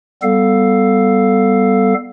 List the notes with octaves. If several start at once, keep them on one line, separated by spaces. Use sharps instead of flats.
G3 B3 A4 F5